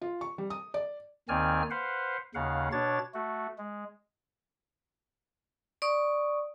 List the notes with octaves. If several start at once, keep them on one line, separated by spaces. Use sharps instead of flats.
F4
C#6
G3
D#6
D5
D#2 D#3 C4 D5 G#5 F6
B4 C5 F5 F#5
D#2 C#3 F5 F#5
B2 D4 C#5 A6
A3 F#4
G#3
D5 C#6 D#6